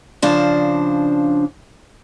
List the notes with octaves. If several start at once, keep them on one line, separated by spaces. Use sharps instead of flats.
C#3 F3 D4 C5